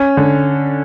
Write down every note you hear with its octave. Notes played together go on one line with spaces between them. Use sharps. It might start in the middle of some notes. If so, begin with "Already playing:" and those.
Already playing: C#4
D3